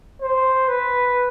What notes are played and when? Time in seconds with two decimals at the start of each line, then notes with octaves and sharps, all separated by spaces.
0.22 C5
0.68 B4